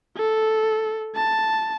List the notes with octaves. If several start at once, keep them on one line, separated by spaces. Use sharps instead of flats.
A4
A5